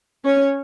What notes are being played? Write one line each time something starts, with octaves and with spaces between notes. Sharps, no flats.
C#4 C#5